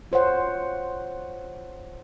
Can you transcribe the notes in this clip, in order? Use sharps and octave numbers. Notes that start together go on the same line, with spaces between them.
F4 C5 C#5 F#5